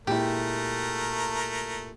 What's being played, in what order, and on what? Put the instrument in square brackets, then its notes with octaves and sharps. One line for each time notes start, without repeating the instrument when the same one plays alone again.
[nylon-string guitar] A#2 G#3 E4 [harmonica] A3 A#4 [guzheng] G4